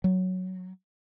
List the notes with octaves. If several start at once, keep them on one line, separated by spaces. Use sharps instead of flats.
F#3